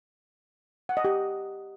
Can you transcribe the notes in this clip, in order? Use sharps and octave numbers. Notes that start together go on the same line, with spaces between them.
F#5
D#5
G4